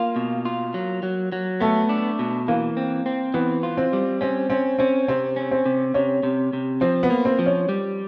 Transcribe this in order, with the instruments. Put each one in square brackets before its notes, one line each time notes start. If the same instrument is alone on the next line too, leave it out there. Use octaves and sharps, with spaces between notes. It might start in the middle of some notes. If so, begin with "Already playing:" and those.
Already playing: [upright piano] A#3 [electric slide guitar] F4
[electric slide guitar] B2
F4
F#3
F#3
F#3
[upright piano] A3 [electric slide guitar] B3
[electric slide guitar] D4
B2
[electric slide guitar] E3 [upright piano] A#3
[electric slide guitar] C4
C4
[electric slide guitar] E3 [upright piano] B3
[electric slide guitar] F4
[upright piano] C4
[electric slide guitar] G3
[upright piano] C4 [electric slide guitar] C#4
[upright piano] C4 [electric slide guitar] C#4
[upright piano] C4 [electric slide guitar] C#4
[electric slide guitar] C3 [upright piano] C4
[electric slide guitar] C#4
[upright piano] C4
[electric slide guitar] C3
[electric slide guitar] C3 [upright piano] C#4
[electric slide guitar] C3
C3
[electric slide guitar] F3 [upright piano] C4
[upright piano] B3
[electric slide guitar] A#3
[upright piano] C4
[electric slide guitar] F3
[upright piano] C#4
[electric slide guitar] G3